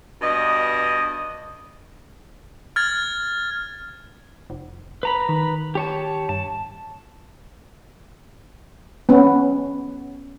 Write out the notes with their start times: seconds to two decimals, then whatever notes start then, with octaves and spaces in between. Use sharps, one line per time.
0.22 G2 B2 D#5
2.76 F6 G#6 A6
4.50 F1
5.03 B4 A#5 B5
5.29 D#3
5.75 G4 C#5 A5
6.29 G2 A5
9.09 B3 C#4